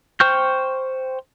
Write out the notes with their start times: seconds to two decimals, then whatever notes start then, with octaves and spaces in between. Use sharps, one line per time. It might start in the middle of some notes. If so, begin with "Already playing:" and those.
0.20 C5 G5 C#6 F6 G6